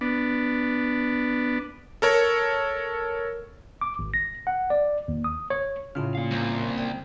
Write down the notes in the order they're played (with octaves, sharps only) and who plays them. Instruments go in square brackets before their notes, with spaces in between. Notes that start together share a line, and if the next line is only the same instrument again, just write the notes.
[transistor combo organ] B3 D4
[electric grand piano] A4 A#4 C#5
[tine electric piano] D6
G#1
A#6
F#5
D5
D#2
D#6
C#5
[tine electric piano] A2 F4 F6 [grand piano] C#3
[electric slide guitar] A#2 F5
[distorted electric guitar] C2
[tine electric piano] G5